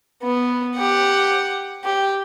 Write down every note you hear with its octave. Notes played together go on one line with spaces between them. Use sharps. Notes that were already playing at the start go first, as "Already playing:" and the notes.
B3
G4 F#5
G4